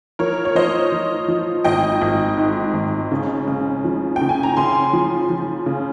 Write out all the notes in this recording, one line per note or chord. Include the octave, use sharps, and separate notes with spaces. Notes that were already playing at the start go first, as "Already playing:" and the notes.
F3 A#4 C#5
C#5
F3 C5 D#5
F3
F3
G#1 D#5 G5
G#1
G#2
G#1
C#3
C#3
F3
G5
C#3
G#5
A#5
C#3 G#5 C6
F3
F3
C#3